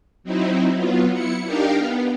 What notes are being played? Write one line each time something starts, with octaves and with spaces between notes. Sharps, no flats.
F#3 C4 D#4 E4
F#3 B3 F4
E4 C#7
D4 D#4 G4 A#4 F5 G5
B3